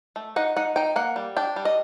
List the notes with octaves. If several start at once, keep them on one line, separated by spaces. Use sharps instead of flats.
A3
D#4 F#5
D#4 F#5
D#4 G5
A#3 F#5
G3
D4 G5
G3
D#5